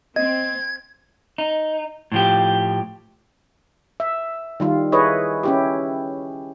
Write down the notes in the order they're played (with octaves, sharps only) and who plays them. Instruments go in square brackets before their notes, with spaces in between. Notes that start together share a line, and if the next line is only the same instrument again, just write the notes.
[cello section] C4 [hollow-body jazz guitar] D#5 [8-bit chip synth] G#6
[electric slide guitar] D#4
A2 F3 G4
[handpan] E5
D#3 G3 F4
E4 G#4 B4 C#5 D#5
C#4 E4 G4